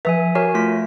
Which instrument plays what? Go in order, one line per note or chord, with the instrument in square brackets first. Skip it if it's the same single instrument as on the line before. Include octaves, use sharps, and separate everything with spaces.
[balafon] F3 B4 [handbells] E5 G#5
[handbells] F#4 A#4 G#5 [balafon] C#5
[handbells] A3 F4 B6